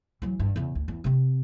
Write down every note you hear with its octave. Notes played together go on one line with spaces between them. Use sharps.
E3 F#3
G2
E2 C#3
D2
E2
C3 C4